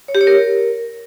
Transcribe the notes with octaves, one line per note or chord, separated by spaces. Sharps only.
C#5
G4
C#5
A#4